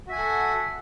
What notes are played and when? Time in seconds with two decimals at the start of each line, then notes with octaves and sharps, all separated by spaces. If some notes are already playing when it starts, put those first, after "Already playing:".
0.07 F#4
0.10 E5
0.12 G#5
0.15 F#5
0.18 A4